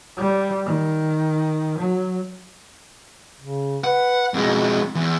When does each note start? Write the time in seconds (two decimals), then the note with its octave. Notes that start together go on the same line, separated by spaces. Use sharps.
0.17 G3
0.65 D#3
1.79 F#3
3.40 C#3
3.84 B4 F#5
4.34 F2 B2 G#3
4.95 E2